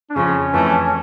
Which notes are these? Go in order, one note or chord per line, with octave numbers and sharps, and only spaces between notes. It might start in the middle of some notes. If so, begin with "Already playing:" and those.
D4
F2 C#3 F3 C#4
F2 E3 A3